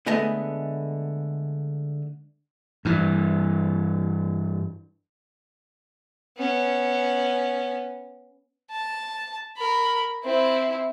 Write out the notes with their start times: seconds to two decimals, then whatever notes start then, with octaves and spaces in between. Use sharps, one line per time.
0.06 D3 G#3 A3 B3 D#5 G#5
2.85 G2 E3
6.37 B3 C#4
8.71 A5
9.58 A#4 B5
10.24 C4 E4